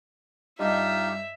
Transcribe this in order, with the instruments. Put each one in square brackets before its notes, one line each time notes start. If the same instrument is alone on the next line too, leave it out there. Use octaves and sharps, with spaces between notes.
[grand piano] G2 [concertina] D#4 F4 G4 [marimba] D#5 [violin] E5